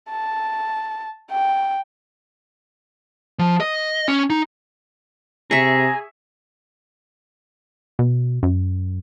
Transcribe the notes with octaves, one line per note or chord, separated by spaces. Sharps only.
A5
G5
F3
D#5
C#4
D#4
C3 G#4 E5 A#5 C#6
B2
F#2